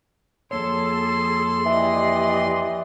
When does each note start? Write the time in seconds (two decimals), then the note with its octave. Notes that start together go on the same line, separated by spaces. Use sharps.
0.51 F2 A#3 G#4 A4 C#5 C6
1.66 E3 G4 D5 D#5